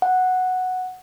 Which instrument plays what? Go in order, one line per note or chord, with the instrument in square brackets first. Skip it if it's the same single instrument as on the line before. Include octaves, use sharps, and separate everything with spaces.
[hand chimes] F#5